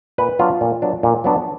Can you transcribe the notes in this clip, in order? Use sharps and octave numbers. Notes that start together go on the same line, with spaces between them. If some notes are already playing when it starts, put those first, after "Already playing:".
A#2 B4
F#3 B3 D4 F4
A#2
F#3 B3 D4
A#2
F#3 B3 D4